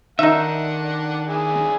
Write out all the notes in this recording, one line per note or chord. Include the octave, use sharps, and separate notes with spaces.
D#3 D4 D#4 E5 F#5
E4 G#4 D5